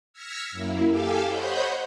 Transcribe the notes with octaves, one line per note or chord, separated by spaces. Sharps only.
E6 F6 G#6 A#6 B6 C#7
F#2 A#3 E4
G4 A4 F5 G#5 D6 E6
C5 C#5 D#5 F#5 B5 G6